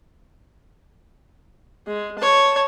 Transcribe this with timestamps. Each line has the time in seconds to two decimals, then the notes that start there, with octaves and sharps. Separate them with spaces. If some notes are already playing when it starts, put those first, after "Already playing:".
1.87 G#3
2.18 C#5 A5